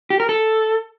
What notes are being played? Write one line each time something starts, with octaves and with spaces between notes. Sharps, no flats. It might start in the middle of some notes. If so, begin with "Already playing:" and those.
G4
A#4
A4